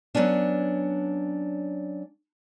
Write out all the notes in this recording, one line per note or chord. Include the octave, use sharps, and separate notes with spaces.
F#3 A#3 B3 C#4 D4